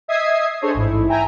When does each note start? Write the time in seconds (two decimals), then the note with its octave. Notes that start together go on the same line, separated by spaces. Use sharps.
0.08 D#5 E5 D#6 G#6 C7
0.61 D4 G#4 A4 C5 C#5 D#5
0.74 A1 G#2 E4
1.08 E5 G5 G#5 A#5